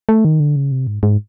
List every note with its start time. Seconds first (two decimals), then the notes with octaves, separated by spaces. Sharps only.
0.09 A3
0.25 D#3
0.40 D3
0.56 C#3
0.72 C3
0.87 G#2
1.03 G#2